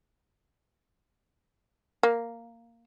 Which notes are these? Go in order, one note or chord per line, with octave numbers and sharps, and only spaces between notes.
A#3